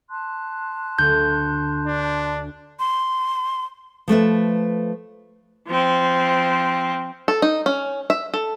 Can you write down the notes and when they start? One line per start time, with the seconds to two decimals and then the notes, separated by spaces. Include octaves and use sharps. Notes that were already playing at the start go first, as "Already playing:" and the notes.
0.10 A5 C6 F#6
0.99 D2 G6
1.86 D4
2.79 C6
4.08 F3 A3 B4 E5
5.68 F3 C4
7.28 A4
7.42 D#4
7.66 C#4
8.10 E5
8.34 A4